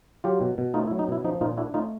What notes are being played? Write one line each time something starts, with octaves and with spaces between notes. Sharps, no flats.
F#3 F4 G4
B2
B2
A3 D#4 F4
E4
F#3
D#4
B2 E4
F3 D#4
A#2 D#4 F4
D4 E4 F#4
A3 D#4 F4